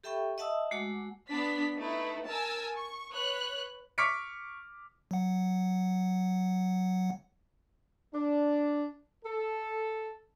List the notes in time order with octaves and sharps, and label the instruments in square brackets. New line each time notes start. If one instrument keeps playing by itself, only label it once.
[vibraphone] G4 A4 E5 G5 B5 C#6
D#5 E5 F#5 A5 D#6 E6
G#3 A3 F#4 F#5 D6
[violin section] B3 D4 B6
A3 D#4 E4 B4
A#4 G#5 A5 E6
C#6
B4 C#5 F#6
[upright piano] C#6 D6 F6 B6 C#7 D7
[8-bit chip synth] F#3 F#5
[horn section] D4
A4